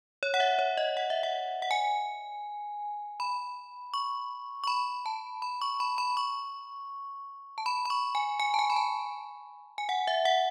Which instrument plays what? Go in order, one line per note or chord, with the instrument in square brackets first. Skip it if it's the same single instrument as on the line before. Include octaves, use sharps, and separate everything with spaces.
[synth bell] C#5
F#5
E5
C#5
D#5
F#5
E5
F#5
F#5
G#5
B5
C#6
C#6
B5
A5
B5
C#6
B5
B5
C#6
A5
B5
B5
C#6
G#5
G#5
A5
G#5
B5
A5
G#5
F#5
E5
F#5